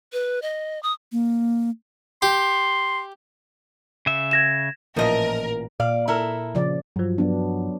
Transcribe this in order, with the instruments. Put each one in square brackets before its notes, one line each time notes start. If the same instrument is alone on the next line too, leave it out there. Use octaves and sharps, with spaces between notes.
[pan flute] B4
D#5
D#6
[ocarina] A#3
[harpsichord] G4 [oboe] C6
[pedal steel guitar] C#3 E5
[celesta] G#6 A#6 E7
[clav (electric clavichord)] A1 A#2 E3 [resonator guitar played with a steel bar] F3 D#5 E5 [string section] A#4
[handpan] A#2 [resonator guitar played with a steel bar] D5 F5
[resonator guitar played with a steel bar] E4 A4 A#4
[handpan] C#3 F3 D5
[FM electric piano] G2 F3 [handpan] F#3
[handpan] F#3 B3 D4